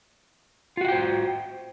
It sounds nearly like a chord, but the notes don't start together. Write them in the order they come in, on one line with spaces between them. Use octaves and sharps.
F4 F#4 F#5 G5 C5